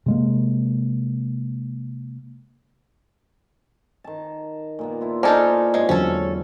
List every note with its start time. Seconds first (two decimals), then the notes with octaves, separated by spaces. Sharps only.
0.06 C3 G#3 A#3
4.04 D#3 A5
4.79 A#2 A#3 B3
5.01 D4 E4 F4
5.23 D#4 A4 A#4 C5 D5 G#5
5.74 G#2 C3 G#3 C#5
5.89 E2 D3 F#3 C#4 A4